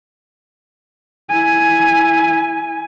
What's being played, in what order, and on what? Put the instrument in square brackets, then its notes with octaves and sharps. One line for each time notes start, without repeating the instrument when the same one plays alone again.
[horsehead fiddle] E4 G#5